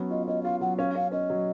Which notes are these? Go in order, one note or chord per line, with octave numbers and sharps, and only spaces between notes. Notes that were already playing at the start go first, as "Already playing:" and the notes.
Already playing: F#3 B3 C#4
F4 D#5
C#4 D#5
F4 F5
F#3 F#5
C#4 F5
C#4 F5
C#4 D#5
F#3